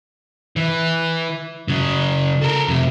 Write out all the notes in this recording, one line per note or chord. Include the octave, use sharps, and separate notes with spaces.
E3
C#3 F#3
A4 A#4
F2 C3